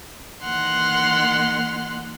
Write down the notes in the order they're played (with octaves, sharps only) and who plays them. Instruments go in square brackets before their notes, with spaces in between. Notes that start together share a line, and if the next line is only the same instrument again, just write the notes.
[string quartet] D#3 E3 A#3 F#5 C6 F6